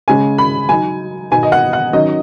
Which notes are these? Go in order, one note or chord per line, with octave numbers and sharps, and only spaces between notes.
C#3 G#3 C#4 G#5
B5
F#3 D#4 G#5
B2 B3 D#4 G#5
D#5
F#5
F#5
D#3 F#3 C#4 D#5